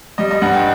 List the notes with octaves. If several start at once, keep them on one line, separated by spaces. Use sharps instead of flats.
G3 D#5
D#5
G2 F#5
G5